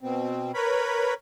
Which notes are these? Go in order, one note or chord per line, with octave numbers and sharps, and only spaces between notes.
B2 C4
A#4 B4 C#5 B5